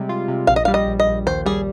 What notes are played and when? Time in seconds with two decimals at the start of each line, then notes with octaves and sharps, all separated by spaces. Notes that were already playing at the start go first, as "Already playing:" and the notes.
Already playing: C3 G3 G#3
0.09 F4
0.28 C3
0.47 A#1 F5
0.56 D#5
0.65 F5
0.68 G3
0.74 D#5
0.87 A#1
1.00 D#5
1.07 A#1
1.26 D#2 C5
1.46 G3 G#4